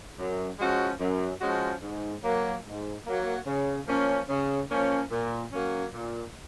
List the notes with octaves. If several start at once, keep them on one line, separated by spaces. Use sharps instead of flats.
F#2
F3 G#3 C#4 F#4
F#2
F3 G#3 C#4 F#4
G#2
F#3 A#3
G#2
F#3 A#3
C#3
F3 A#3 C#4
C#3
F3 A#3 C#4
A#2
F#3 A#3 C#4
A#2